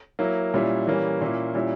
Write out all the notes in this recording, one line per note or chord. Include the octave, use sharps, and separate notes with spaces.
F#3 A#3 E4
A#2 G3 C#4 E4
E3 G3 A#3 C#4
A#2 A#3 C#4 E4
A#2 G3 C#4 E4